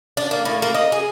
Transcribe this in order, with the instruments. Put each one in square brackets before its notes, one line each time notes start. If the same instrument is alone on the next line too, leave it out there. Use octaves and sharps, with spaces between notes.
[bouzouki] D4
A#3
A2
A#3
D#5
G#4